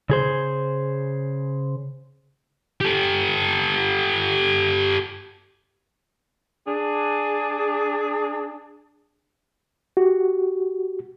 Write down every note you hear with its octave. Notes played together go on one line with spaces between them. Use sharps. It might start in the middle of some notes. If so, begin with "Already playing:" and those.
C#3 G#4 C5
G4 A4
D4 G#4
F#4 G4